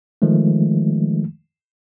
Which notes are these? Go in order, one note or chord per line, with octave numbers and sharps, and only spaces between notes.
D#3 F3 G#3 A3